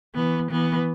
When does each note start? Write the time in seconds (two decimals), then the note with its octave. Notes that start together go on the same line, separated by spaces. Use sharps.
0.15 E3 B3
0.51 E3 B3